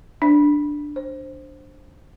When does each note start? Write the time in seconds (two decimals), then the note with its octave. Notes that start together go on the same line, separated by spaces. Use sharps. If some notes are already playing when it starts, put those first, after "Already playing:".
0.22 D4
0.96 C5